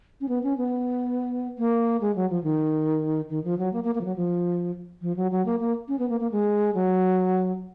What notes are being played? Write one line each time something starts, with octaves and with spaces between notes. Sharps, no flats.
C#4
B3
C#4
B3
A#3
G#3
F#3
F3
D#3
D#3
F3
F#3
A#3
A#3
A#3
F3
F#3
F3
F3
F#3
F#3
A#3
A#3
C#4
B3
A#3
A#3
G#3
F#3